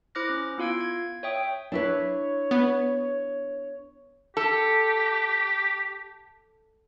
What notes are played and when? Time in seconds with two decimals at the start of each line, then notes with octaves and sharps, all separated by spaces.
0.15 E4 C5 D6 F6 F#6 A#6
0.30 C#4
0.58 B3 E4 F4 F5 G#6 D7
0.81 G#6
1.23 C#5 E5 G5 D#6
1.72 D4 E4 B4 C#5
2.51 B3
4.37 G4 A4